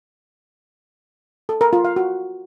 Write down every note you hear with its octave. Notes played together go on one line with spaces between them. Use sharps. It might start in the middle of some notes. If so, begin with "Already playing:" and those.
A4
A#4
F4
F5
F#4